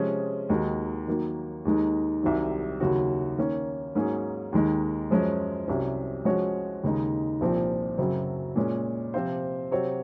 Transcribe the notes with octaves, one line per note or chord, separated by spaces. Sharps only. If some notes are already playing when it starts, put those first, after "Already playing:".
Already playing: C3 F3 G#3 C#4 G#4
D#2 D#3 G#3 D#4 F#4
D#3 F#3 A#3
D#2 D#3 G#3 D#4
C2 C3 D#3 F#3
D#2 C#3 F#3 C#4 F#4
D#3 A#3 C#4
G#2 F#3 A#3 C#4 G#4
D#2 D#3 G#3 D#4
F#2 F3 G#3 C#4
C2 C3 F#3 C#4
F3 G#3 C#4 F#4 C#5
D#2 C#3 G#3 D#4
C2 A#2 F3 C4
F#2 C#3 F#3 C4
A#2 G#3 C#4
C3 F3 C4 F4 C5
C3 F#3 C4 F#4 C#5